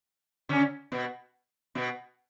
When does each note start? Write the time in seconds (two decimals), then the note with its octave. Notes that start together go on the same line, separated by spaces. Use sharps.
0.49 C#3 C#4
0.92 B2 B3
1.75 B2 B3